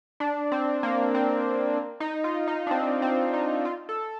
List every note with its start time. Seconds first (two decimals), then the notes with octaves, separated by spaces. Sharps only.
0.20 D4
0.52 C4
0.83 A#3
1.15 C4
2.00 D#4
2.24 F4
2.48 D#4
2.67 D4
2.71 C4
3.02 C4
3.34 D#4
3.65 F4
3.89 A4